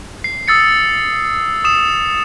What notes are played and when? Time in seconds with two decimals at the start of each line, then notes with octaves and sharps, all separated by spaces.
0.24 C7
0.48 D#6 E6 A6 C#7
1.65 D#6 E7